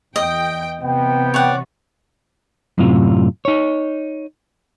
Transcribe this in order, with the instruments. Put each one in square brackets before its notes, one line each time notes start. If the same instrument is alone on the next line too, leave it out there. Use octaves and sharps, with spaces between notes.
[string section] E2 G5 [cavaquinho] D#5
[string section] C3 E3 [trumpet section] B3 G5
[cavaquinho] C#5 D5 F#5
[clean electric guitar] F#2 A2 C3 F4
D#4 C#5